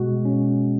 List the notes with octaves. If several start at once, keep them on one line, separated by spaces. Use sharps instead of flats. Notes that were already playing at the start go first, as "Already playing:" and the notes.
Already playing: B2 G#3 F#4
C#4